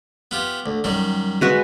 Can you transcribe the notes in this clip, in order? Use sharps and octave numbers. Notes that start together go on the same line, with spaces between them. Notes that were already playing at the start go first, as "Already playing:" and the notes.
B3 F4 G4
D2
F#2 D#3 G3
G#3 F#4 B4